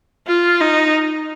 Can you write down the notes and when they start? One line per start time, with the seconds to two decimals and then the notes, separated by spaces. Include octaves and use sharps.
0.27 F4
0.61 D#4